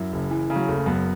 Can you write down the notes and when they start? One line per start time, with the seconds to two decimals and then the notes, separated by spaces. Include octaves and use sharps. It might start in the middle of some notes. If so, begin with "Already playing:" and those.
Already playing: F#2 E4
0.12 F#1
0.31 E3
0.50 C#3
0.56 F#3
0.68 F#1 A3
0.86 F#2 B3